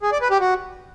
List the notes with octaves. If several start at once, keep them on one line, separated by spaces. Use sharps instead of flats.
G#4
D5
B4
G4
F#4